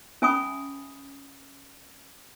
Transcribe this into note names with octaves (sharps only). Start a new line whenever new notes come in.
C#4 E5 G#5 B5 C#6 D#6